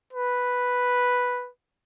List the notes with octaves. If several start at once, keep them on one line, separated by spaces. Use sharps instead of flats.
B4